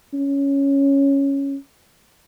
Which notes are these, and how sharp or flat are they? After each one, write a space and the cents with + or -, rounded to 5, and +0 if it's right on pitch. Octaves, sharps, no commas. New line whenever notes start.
C#4 +0